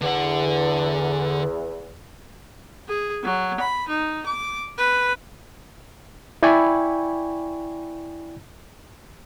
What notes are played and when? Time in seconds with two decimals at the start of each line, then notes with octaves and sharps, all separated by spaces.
0.01 E2 D3 F#5
2.89 G#4
3.23 F#3
3.60 B5
3.89 D#4
4.26 D6
4.78 B4
6.43 E4 D5 G5 G#5 B5 C#6